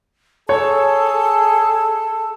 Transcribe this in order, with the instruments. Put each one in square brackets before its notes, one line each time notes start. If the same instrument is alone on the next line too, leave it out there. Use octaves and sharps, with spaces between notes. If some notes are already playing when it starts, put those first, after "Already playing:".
[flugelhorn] G#4 [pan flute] A4 [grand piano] C#5 [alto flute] A5